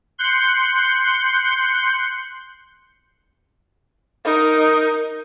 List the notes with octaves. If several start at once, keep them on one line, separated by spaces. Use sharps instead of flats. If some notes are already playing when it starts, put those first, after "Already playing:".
C6 F#6 G6 C#7
D#4 A#4